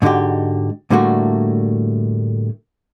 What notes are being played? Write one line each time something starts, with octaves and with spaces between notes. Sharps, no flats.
G#2 D3 D#4 F#4 G4
A2 D3 G3 A3 A#3 F#4